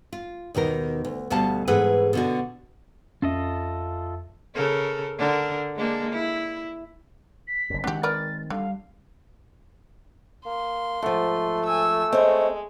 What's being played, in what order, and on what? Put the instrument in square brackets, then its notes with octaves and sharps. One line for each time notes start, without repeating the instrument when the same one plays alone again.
[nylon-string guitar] F4
D#2 B2 D#3 A#4
D2
D2 B2 G3 F5 A5
G#2 E3 G#4 A4 B4 F#5
B2 D3 F#4
[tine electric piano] F2 E5 [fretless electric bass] C#4 [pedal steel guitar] F4 A4 D#5
[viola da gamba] C#3 A4 A#4
D3 D4 A#4
G#3 A#3 D4
E4
[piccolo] B6
[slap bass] F#1 F#2
[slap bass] D#3 G#3 C4 [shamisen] D4 G4 [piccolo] F#5
[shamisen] A#4 B4 D5 [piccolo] A6
[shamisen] D3 [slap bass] G3 [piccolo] F5
[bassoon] A#3 [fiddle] C6
[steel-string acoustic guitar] G#2 F3 [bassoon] A3
[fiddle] G#5 E6
[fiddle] G#3 [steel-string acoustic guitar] C4 C#5 [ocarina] D#5